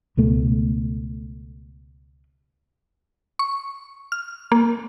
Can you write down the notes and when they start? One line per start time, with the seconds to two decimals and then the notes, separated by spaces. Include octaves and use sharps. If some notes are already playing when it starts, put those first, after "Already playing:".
0.17 C#2 B2 A3
3.39 C#6
4.12 F6
4.52 A#3